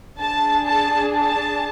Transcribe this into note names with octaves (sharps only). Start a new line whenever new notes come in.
D4 G#4 A5
A5
A5